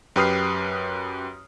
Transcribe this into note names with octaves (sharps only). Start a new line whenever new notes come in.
F#2 G4 B4 D#6 F6 C7